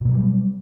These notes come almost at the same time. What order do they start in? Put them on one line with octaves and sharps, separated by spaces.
B2 A#3 F#3 G3